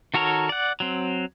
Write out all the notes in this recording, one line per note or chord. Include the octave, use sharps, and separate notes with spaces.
D#3 F#4 A4 A#4 C#5
D5 F#5
F#3 C4